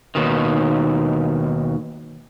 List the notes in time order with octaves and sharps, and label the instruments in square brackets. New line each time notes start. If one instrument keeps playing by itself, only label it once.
[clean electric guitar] D#2 B2 D#3